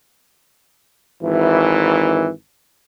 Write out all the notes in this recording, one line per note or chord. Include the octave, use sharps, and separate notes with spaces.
G#1 E3